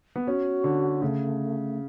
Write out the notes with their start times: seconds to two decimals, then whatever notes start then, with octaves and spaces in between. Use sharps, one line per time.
0.16 B3
0.27 C#4 F#4
0.64 D3
1.02 C#3 A3